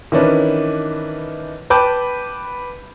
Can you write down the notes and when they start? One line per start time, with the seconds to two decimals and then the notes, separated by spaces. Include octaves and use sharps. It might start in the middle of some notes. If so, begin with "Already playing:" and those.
0.12 D#3 E3 C#4 D4 B4
1.70 B4 G5 A5 B5 D6 G6